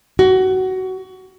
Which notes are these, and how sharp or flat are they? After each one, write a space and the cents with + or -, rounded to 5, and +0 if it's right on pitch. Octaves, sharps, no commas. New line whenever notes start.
F#4 +20